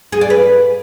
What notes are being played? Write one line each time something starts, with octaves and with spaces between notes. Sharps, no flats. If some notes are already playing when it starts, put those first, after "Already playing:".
G#4
D5
B4